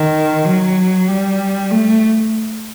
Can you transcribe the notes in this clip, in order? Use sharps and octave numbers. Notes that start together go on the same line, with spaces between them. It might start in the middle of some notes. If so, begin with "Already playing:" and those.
Already playing: D#3
F#3
G3
A3